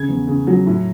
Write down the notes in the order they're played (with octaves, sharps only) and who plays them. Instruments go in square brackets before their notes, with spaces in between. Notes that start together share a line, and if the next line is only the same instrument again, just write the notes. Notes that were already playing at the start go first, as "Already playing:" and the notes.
Already playing: [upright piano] C#3 G#6
E2
C#3
F#3
A2